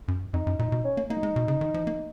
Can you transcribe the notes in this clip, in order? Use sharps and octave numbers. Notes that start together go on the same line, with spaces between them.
F#2
F2 D#4
F#2
A#2 D#4
B2
C#4
A#3
A#3 D#4
F#3
G#3
B2
C#3
D#3
F3
A#3